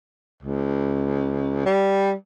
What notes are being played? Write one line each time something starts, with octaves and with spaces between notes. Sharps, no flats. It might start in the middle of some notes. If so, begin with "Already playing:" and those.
C#2
G3